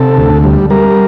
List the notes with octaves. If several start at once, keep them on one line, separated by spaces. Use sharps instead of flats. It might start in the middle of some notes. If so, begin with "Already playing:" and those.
Already playing: C3 A4
D2
G3
G3 A#4